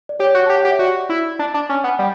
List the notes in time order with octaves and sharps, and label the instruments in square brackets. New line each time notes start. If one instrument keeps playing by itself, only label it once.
[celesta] D5
[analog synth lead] G4 [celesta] C#5
[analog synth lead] F#4
[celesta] A5
[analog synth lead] G4
[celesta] G5
[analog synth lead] G4 [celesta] F#5
[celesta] E5
[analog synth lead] F#4 [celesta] D5
[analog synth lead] E4
D4
D4
C#4
B3
G3